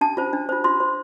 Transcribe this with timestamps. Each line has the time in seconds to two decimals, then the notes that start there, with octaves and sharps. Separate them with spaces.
0.01 D4 A5
0.17 F4 C5
0.33 D4
0.49 F4 C5
0.64 F4 C6
0.80 C5